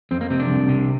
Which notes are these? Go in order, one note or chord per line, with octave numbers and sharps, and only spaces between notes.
F2 C4
A#3
C3 C4
D4
C2
C3